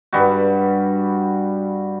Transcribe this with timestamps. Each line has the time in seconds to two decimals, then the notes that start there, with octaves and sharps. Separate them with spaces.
0.13 G2 G3 F#4